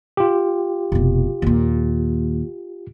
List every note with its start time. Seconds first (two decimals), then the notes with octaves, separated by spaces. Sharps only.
0.17 F4 G4
0.92 F1 B2
1.42 D#2 A#2